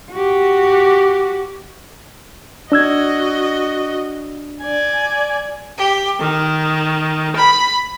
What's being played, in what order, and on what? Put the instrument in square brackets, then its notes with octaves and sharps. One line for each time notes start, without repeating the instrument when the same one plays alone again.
[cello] F#4 G4
[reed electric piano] D4 E6 G#6 [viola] F#4 D#5
[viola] D5 G#5
[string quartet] G4
D#3
B5